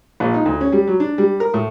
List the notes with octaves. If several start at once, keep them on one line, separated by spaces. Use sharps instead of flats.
A#1
D#4
D2
C#4
G3
F#3
D4
G3
A#4
A2